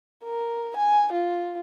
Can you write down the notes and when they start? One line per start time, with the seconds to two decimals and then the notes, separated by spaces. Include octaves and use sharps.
0.24 A#4
0.76 G#5
1.12 F4